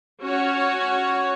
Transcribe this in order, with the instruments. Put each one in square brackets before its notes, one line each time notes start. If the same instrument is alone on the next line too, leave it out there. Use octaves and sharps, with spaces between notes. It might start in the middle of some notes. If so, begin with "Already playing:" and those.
[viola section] C#4 F#4 C#5